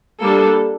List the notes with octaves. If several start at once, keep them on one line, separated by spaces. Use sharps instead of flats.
G3 A#3 D4 A4